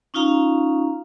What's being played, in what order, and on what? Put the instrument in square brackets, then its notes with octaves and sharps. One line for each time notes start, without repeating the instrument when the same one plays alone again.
[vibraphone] C#4 D#4 F4 F5 A#5